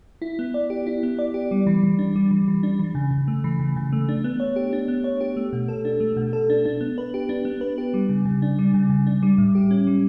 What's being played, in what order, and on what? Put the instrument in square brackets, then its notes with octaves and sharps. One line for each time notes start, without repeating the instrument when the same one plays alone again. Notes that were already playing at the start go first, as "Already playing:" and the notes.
[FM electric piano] E4
B3
D5
G4
E4
B3
D5
G4
G3
E3
E3
D4
G3
E3
E3
D4
E3
C#3
C#3
A3
E3
C#3
C#3
A3
D4
B3
C#5
G4
D4
B3
C#5
G4
A3
B2
A4
D4
A3
B2
A4
D4
D4
B3
B4
G4
D4
B3
B4
G4
G3
C#3
C#3
D4
G3
C#3
C#3
D4
G3
A2
G4
C#4
G3